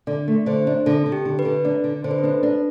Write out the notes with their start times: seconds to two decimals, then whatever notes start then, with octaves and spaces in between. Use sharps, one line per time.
0.07 D3 D5
0.28 A3
0.46 D3 C5
0.67 D4
0.86 D3 A4
1.06 D3
1.12 G4
1.25 D3
1.39 B4
1.45 D3
1.65 D4 D5
1.84 D3
2.04 D3 C5
2.11 B4
2.18 A4
2.23 D4 B4
2.43 D4 A4